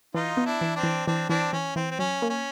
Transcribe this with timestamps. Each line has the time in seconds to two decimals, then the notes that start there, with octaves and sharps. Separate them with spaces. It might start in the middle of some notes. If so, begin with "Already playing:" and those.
0.14 E3 D#4 F4
0.37 B3
0.46 D4 E4
0.61 E3
0.76 C4 D4
0.83 E3
1.06 E3 C4 D4
1.29 E3 C4 D4
1.53 E3 C#4
1.76 E3 C4
1.91 C4
1.99 F#3 C#4
2.22 A#3
2.30 C#4